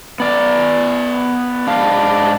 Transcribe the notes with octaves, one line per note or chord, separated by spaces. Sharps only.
B3 D5
G#2 D4 F5